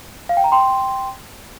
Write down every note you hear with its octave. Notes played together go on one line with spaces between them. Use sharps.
F5
G5
A#5
G5 C6